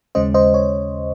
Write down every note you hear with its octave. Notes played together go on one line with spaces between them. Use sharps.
D#2 C#3 G#3 C#4 C5 D#5
C5 D#5
C#5